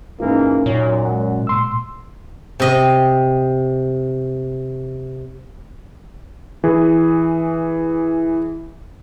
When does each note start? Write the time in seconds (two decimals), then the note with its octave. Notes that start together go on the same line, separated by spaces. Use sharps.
0.20 G#2 E3 A#3 C#4 D#4 F4
0.66 F#2 A#2 C#5
1.05 G#3 F#5
1.47 A#2 C6 E6
2.60 C3 D#5
6.64 E3 G#4